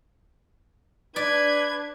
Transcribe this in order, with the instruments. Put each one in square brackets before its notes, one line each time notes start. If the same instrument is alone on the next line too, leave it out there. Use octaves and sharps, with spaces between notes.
[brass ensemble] D4 [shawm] B4 [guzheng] D5 [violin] G#6